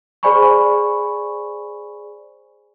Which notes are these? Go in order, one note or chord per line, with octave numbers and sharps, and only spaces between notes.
G#4 C5 D5 G#5 B5 C#6